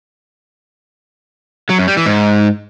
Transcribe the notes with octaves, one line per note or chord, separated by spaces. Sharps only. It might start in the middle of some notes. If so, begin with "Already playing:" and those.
F#3
F#2
G3
E3
G#2